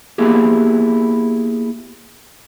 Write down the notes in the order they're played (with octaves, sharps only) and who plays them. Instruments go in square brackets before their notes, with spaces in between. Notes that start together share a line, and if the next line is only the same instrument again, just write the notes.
[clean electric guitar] A#3 B3 E4 G4 G#4